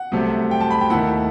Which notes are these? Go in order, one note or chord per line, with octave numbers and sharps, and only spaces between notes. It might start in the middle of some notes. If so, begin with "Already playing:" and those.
Already playing: F#5
C2 C3 F#3 A3 C4
G5
A5
B5
G5
D#2 D#3 A3 E4 F#5